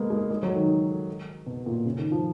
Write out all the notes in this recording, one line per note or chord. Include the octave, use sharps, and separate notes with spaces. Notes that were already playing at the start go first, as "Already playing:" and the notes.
Already playing: G#3 A#3 B3
G#3
G#3
F#3
D#3
B2
A#2
C#3
D#3
F3